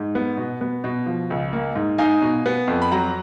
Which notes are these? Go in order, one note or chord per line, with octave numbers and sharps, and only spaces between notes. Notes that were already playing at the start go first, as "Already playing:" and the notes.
Already playing: G#2
B3
B2
B3
B2
F3
C#2
A#3
G#2
D#4 F5 G#5
B2
B3
F2
B5
F#3 F#5 A#5